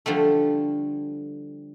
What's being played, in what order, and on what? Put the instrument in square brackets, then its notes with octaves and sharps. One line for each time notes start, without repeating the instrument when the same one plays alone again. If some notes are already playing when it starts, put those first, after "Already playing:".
[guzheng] D3 F3 G3 A3